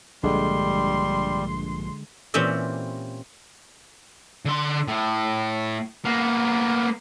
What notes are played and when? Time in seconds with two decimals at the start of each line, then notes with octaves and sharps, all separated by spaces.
0.23 A#1 G2 D3 G3 G#3 C6
2.34 A#2 E3 C4 C#4 G4 E5
4.45 D3 C6
4.88 A2
6.05 A#3 B3